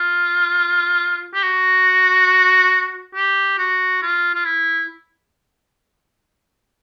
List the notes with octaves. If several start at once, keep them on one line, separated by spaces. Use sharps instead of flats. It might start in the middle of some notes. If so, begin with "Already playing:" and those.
Already playing: F4
G4
F#4
G4
F#4
F4
F4
E4